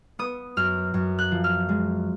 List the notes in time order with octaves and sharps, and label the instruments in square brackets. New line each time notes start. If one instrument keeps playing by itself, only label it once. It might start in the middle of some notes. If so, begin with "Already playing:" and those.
[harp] B3 D#6
F#2 F6
F#2
F#6
F3
F6
G#3